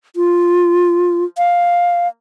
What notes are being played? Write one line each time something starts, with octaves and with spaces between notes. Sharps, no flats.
F4
F5